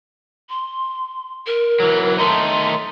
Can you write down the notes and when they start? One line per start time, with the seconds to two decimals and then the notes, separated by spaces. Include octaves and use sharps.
0.49 C6
1.47 A#4
1.80 E3 F#3
2.18 D#3 A3 D#4 C6